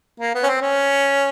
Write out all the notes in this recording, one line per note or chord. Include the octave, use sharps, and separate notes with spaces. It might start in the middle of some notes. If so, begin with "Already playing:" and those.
A#3
B3
C#4
C4
C#4